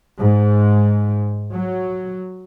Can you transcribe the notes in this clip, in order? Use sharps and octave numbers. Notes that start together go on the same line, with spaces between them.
G#2
F#3